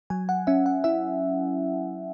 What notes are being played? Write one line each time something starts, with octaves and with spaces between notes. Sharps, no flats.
F#3 G#5
F#5
C#4 E5
F#5
E4 E5